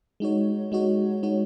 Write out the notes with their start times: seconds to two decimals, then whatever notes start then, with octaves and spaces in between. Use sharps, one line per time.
0.20 G#3 D#4 F#4 C#5
0.72 G#3 D#4 F#4 C#5
1.23 G#3 D#4 F#4 C#5